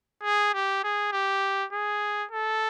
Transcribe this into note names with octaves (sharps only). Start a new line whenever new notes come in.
G#4
G4
G#4
G4
G#4
A4